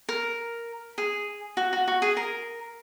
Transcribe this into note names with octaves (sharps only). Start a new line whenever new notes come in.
A#4
G#4
F#4
F#4
F#4
G#4
A#4